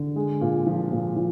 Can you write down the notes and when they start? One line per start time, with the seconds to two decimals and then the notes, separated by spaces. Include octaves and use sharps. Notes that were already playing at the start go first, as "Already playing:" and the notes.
Already playing: D3
0.16 G#3
0.41 A#2
0.67 F3
0.92 A#2
1.16 F3